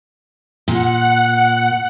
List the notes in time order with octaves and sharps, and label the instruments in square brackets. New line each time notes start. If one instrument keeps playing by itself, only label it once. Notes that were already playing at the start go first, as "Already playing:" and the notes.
[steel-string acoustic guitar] A#2 [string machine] F#5